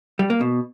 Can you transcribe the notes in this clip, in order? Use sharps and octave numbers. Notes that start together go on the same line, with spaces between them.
G3
A#3
B2